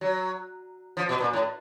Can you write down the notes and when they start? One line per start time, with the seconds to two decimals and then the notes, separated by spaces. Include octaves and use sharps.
0.01 F#3
0.97 F3
1.09 B2
1.20 A#2
1.33 A2